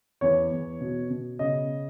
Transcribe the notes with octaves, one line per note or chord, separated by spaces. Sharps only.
E2 C#5
E2
B2
B2
C#3 D#5